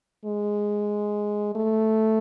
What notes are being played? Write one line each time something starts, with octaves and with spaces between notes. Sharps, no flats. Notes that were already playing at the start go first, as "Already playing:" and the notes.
G#3
A3